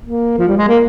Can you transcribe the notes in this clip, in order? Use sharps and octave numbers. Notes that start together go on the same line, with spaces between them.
A#3
F3
G3
G#3
A#3